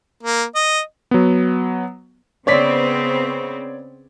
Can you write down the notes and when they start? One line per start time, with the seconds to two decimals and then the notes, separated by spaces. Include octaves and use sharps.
0.23 A#3
0.55 D#5
1.11 F#3 B3
2.47 C#3 B3 C4 C#5 D5 B6